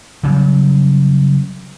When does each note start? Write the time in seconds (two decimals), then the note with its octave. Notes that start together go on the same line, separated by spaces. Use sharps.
0.23 C#3 F#3 G3